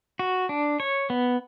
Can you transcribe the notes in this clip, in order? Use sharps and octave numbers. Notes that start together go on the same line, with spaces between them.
F#4
D4
C#5
B3